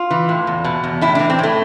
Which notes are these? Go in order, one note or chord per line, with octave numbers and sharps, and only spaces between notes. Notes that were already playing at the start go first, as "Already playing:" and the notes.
Already playing: F4
E3
A2
E2
B2
E2
A2 E4
E3 D4
C4
A2 A3